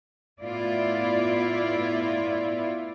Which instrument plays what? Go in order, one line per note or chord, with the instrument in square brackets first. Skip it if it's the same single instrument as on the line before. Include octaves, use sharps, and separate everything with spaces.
[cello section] A2 B3 E4 F4 D5